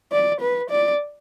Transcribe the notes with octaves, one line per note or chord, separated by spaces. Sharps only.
D5
B4
D5